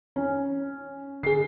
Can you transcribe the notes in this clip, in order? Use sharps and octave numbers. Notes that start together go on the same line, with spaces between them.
C#4
D3 G#4 C7